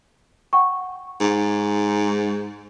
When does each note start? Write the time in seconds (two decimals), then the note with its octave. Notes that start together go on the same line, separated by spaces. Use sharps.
0.53 F#5 G5 C#6
1.20 G#2